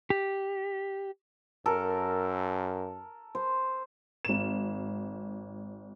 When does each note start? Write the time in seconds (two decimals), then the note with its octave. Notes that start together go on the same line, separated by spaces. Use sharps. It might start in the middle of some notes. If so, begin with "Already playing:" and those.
0.10 G4
1.66 F#2 A4 A#4
3.35 C5
4.25 G#1 E7